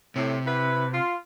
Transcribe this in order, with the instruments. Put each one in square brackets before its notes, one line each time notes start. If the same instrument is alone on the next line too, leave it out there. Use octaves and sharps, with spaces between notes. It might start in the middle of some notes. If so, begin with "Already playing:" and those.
[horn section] A2 [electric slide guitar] C3
[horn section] E4 B4
F4